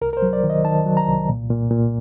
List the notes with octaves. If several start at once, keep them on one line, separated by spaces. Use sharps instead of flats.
C2 A#4
A#4
C5
F#3
D5
D#3
D#5
D#3 A5
F#3
A#5
C2
A#2
A#2
A#2